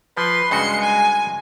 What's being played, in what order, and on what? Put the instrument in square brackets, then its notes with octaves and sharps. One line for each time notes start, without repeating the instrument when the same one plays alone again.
[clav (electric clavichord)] F3 [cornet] B4 [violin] C6
[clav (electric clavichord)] G2 C#3 F#4 [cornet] G#3 [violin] C6 C#7
[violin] G#5